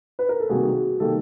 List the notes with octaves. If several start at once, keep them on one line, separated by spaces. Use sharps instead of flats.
B4
A#4
A4
C2 C3 D#3 G3 A#3 F#4 G#4
C3 D#3 G3 A#3 G4 A4